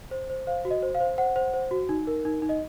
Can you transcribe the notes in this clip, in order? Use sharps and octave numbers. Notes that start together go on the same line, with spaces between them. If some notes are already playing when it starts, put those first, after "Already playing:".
C5
C5
C5 F5
F#4
D#5
C5
F5
C5
C5 F#5
C5
C5
F#4
D#4
A#4
D#4
D#4
D#5